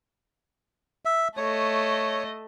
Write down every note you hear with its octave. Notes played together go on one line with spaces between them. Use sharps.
E5
A3 C#5 D#5